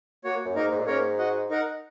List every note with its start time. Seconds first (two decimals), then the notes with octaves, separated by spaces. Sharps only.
0.24 A#3 F#4 C#5
0.45 F#2
0.55 G#2 A#3 D#4 A#4
0.71 G#2
0.78 A#2
0.86 G#2 A#3 C#4 A#4 C#5
1.18 F#4 D#5 F#5
1.49 D#4 A#4 F#5